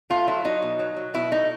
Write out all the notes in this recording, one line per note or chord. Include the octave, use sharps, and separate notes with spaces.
A3 F4
F#3 E4
F#3 D#4
B2
F#3
F#3
B2 E4
A3 D#4